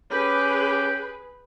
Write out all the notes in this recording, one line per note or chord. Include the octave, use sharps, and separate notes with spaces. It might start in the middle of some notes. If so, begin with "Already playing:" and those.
C#4 G4 G#4 B4